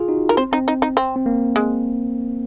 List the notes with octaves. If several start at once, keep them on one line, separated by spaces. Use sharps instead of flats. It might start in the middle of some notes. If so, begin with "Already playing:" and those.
Already playing: F4 G#4
D#4 F#4
A#4
C4 C5
C4 D#4
D#4
D#4
C4
C4
A#3
G#3